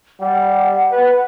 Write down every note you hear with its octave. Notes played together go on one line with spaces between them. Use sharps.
G3 F#5
B4